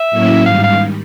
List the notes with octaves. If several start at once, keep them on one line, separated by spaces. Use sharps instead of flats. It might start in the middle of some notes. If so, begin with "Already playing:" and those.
Already playing: E5
A2 F#3 A#3 C#4 E4
G#2 D#3 G3 F5
F5